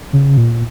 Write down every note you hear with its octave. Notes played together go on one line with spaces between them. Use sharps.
C#3
A#2